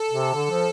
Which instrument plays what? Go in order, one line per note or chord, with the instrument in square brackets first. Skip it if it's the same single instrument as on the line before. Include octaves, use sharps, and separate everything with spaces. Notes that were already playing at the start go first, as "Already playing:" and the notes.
Already playing: [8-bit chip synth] A4
[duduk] C3
D3
F3